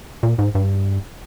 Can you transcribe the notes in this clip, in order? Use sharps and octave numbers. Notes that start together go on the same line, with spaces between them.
A#2
G#2
G2